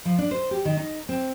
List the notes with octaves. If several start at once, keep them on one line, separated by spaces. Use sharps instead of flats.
F3
D4
C5
G4
D#3
D#4
C4